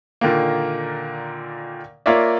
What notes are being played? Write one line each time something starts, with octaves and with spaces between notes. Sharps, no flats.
A#2 D3 D#3 A#3
A#3 F4 A#4 C#5 D5 E5